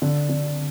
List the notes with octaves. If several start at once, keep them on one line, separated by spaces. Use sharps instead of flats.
D3
D3